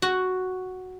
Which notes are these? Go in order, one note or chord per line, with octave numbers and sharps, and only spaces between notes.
F#4